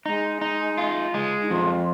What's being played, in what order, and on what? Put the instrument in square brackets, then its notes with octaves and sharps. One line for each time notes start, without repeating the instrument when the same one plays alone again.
[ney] G#3 [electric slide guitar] D#4
[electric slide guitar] D#4
F4
G#3
[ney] D#4
[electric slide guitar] F2 [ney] F4